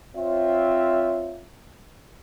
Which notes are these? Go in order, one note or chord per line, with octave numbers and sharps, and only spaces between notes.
C4 F4 C#5 E5